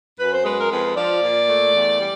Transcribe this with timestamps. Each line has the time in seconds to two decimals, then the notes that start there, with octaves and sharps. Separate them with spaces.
0.19 F#2 B4
0.32 C5
0.45 G#3 B4
0.58 A#4
0.71 F2 B4
0.97 F3 D5
1.22 A#2
1.49 A3
1.75 E2
2.00 G3